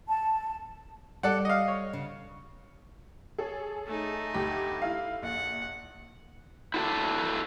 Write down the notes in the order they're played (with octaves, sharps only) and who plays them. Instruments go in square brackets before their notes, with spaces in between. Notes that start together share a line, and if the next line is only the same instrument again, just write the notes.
[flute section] A5
[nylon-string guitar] G3 [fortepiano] A4 D5 F#5
[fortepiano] D#5 F5
C#5
[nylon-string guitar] C#3
[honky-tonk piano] G#4 A4 C#5
[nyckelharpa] A3 D#4
[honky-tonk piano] D2 G4 B5
E4 F5
[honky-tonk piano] A#1 [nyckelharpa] F#5
[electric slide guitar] E4 F#4 A4 F5 A5